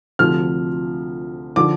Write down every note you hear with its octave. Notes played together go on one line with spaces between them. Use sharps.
D2 C3 F3 F6
D3 F3 D6